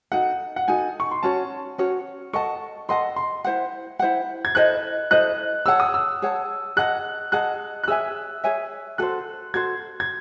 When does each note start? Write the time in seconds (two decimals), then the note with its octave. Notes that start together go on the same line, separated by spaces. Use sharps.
0.12 D#4 F#4 A4 F#5
0.56 F#5
0.68 D#4 F#4 A4 G#5
1.00 C#6
1.11 C6
1.23 C#4 F#4 C#5 A5
1.78 C#4 F#4 C#5
2.33 A4 D#5 F#5 A5 C#6
2.89 A4 D#5 F#5 A5 C6
3.16 C6
3.44 E4 C5 F#5
3.99 E4 C5 F#5
4.45 G#6
4.55 E4 A4 C5 D#5 F#6
5.11 E4 A4 C5 D#5 F#6
5.66 G#4 C#5 F#5 A5 E6
5.80 D#6
5.94 E6
6.22 G#4 C#5 F#5 A5
6.76 G#4 D#5 F#5 A5 F#6
7.32 G#4 D#5 F#5 A5 F#6
7.84 F#6
7.88 G#4 C#5 E5 G#5 E6
8.44 G#4 C#5 E5 G#5
8.98 F#4 A4 C5 F#6
9.54 F#4 A4 C5 G#6
10.00 G#6